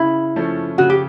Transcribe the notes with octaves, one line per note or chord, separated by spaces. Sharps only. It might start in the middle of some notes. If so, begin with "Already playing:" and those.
Already playing: C#3 E4
F3 A3 C#4
C#3 F#4
G4